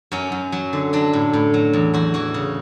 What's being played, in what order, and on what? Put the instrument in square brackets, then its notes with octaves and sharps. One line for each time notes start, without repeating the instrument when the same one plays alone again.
[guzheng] F#2 C#4
F#2
F#3
D3
F#3 D4
A2
A2
F#3
E2
E2 F#4
E3 F#4
C#3